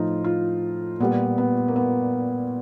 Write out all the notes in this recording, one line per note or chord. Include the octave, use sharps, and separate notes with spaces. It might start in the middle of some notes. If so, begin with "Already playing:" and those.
Already playing: A2 F3 D#4 F4
F4
A#2 G3 B3
B3
A#3
B3